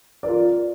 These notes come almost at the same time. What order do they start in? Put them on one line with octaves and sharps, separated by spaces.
D5 A#4 F4